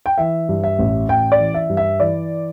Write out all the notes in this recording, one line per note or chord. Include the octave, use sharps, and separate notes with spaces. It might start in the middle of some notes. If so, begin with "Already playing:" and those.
G5
E3 E5
G2
E5
A1
A1 G5
D5
E3
E5
G2
E5
E3 D5